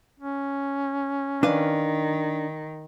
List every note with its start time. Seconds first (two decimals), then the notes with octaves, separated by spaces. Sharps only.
0.20 C#4
1.43 D#3 D4 B4 F5